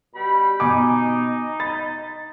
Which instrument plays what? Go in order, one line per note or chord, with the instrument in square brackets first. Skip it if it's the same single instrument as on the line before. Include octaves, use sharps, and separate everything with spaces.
[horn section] B2 G3 B5
[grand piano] B2 G#5 D6 [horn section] D#4
[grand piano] B5 A6